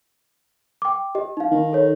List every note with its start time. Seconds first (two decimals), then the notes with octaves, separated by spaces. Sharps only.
0.82 G5 D6
1.15 G4 D#5
1.37 D#4 F5
1.51 D#3
1.73 A4 C#5